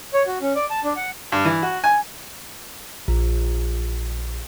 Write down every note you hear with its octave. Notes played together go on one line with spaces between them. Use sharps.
C#5
F#4
C#4
D5
A5
D4
F#5
G2
E3
F#4
G#5
A#1